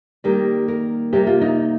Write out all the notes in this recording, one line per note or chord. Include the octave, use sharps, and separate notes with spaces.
D#3 G3 A#3 G4
A#4
C3 G3 A#3 G4
F4
D#4